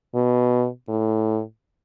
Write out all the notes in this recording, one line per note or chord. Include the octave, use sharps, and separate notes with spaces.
B2
A2